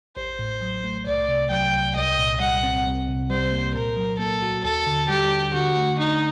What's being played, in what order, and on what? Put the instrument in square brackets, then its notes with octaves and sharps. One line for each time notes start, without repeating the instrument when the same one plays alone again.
[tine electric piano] A1 [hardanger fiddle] C5
[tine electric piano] A2
F#3
A3
[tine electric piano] C2 [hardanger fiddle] D5
[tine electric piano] C3
[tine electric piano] F#3 [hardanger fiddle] G5
[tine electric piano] C2
[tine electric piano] C2 [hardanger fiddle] D#5
[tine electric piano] A#2
[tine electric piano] G3 [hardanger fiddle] F#5
[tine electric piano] C4
C2
C3
[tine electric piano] G3 [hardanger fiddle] C5
[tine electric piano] A#3
[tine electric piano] A#2 [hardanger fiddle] A#4
[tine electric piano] F#3
[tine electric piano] A#3 [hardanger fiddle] A4
[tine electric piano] F#4
[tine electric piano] D#2 [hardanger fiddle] A4
[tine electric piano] D3
[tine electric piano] G3 [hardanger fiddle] G4
[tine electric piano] D4
[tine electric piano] D3 [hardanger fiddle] F#4
[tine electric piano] A3
[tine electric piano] D4 [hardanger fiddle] D#4